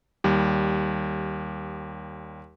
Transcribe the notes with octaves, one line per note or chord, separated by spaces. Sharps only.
D#2 G3